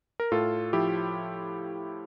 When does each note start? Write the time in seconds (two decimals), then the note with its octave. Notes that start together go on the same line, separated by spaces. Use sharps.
0.20 A#4
0.32 A2 F4 A4
0.73 F3 E4 G4